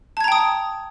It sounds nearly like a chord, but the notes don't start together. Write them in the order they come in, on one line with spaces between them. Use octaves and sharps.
A5 G#6 A#5 G5 D#6